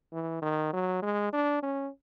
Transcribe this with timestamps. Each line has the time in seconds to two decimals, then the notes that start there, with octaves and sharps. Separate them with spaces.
0.13 E3
0.42 D#3
0.73 F#3
1.02 G#3
1.33 D4
1.63 C#4